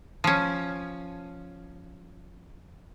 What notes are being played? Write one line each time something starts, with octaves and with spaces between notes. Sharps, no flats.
F3 C#4